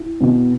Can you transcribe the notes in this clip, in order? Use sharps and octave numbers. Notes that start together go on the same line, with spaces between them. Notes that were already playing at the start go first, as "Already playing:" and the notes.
Already playing: E4
B2